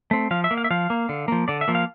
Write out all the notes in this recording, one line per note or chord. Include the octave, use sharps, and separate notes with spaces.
A3 C4
F3 F5
E5
A#3
F5
E5
F3 F5
A#3
D3
F3 A#3
D3 D5
E5
F3 A#3
F5